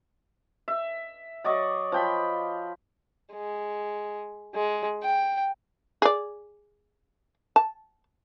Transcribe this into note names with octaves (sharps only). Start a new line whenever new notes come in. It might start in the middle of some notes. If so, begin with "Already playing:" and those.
E5
F#3 D5 D#5 C#6
F3 G5 B5
G#3
G#3
G5
G#4 D5
A5